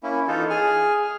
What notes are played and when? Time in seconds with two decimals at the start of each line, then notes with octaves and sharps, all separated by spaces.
0.03 A#3 C#4 E4
0.28 E3 D#4 F4 A4
0.50 G#4 G#5 F6